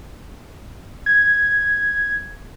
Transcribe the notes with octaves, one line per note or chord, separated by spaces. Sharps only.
G#6